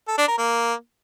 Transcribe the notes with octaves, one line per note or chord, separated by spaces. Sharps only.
A4
D4
A#4
A#3